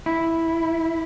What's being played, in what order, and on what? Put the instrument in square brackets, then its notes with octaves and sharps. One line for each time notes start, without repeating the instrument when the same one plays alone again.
[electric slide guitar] E4